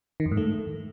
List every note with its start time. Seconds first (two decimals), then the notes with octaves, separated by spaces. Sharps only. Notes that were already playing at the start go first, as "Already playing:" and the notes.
0.20 D#3
0.26 F2
0.31 G#2
0.37 A3